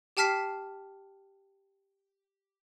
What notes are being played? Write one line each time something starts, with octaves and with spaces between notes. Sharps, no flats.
G4 G5 A5 F6 B6 C7